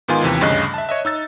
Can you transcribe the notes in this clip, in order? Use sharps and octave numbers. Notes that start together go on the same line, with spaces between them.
G#2 D#3 B3 F4 G#5 C6
D#2 C3 E3
D2 G2 C#3 D#5 F#6
E5 A5
C#5 D#5 E5
D#4 E6 A6